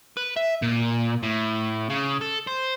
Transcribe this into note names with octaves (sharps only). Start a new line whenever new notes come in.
B4
E5
A#2
A2
C#3
A4
C5